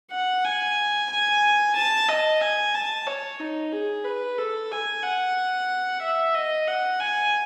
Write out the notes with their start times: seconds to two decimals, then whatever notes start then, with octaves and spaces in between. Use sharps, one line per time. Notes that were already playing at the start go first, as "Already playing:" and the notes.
0.11 F#5
0.44 G#5
1.10 G#5
1.75 A5
2.09 D#5
2.41 G#5
2.74 A5
3.07 C#5
3.40 D#4
3.72 G#4
4.05 B4
4.38 A4
4.71 G#5
5.03 F#5
6.02 E5
6.34 D#5
6.67 F#5
7.00 G#5